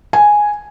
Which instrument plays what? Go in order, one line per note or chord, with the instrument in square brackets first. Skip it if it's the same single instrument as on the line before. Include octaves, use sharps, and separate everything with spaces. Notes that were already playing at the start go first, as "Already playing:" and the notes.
[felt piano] G#5